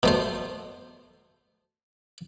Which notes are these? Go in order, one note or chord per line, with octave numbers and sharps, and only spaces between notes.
B2 A3 C5